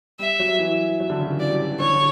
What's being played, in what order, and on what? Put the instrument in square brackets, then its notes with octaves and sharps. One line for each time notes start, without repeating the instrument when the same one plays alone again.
[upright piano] G3 [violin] E5
[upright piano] F#3
E3
F#3
D3
C#3
E3
[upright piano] F#3 [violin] D5
[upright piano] G3
F#3
E3
[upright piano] D3 [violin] C#5
[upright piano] D3